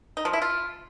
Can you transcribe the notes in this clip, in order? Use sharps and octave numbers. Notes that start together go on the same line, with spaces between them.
D#4
F3
E4
F4